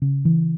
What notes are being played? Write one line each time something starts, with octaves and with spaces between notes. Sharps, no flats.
C#3
E3